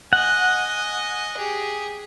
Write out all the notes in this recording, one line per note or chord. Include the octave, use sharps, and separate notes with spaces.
D#5 F#5 G#5
G4 G#4